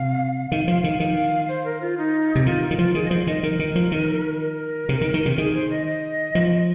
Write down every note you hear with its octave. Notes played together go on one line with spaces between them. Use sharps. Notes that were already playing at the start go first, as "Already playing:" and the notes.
Already playing: C3 F5
D#3 F5
F3 F5
D#3 F5
D#3
F5
C5
A#4
F4
D#4
C3
D#3 F4
F4
D#3
F3 F4
D#3 G#4
D#5
F3 C5
D#3 D#5
D#3 A#4
D#3
F3
D#3
A#4
C3
D#3
D#3
C3
D#3 G#4
C5
D#5
D#5
F3